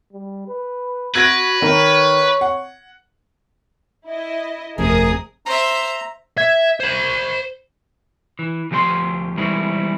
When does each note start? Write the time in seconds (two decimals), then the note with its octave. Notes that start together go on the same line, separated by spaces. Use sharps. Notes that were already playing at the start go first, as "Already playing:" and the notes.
0.13 G3
0.48 B4
1.15 F#4 B4 G#6 A#6 D7
1.62 D#3 A#4 C#5
2.41 F#5
4.07 E4 D#5
4.78 G1 F2 C3 A3 C#4 G#4 A#4 D#6
5.46 C5 E5 A#5
6.38 E5 G#6
6.80 C5 B5
8.39 E3
8.71 D2 F3 G4 C#5 C6
9.37 E3 G3 G#3 C4 D#4 E4